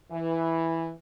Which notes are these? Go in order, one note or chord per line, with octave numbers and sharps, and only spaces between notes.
E3